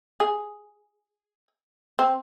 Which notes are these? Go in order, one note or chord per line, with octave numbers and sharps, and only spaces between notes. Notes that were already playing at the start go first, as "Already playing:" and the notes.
G#4
C4